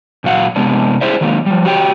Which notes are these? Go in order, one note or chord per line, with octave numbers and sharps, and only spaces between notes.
A#2 F#3 F5 F#5
C3 G#3 B3 D4
E4 G#4 C5 D5 E5
D#3 F#3 G#3 A#3
F3 G3
F#4 G4 C#5 G5